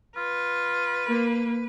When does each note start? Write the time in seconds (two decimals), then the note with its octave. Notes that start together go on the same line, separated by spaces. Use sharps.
0.17 F4 B4
1.07 A#3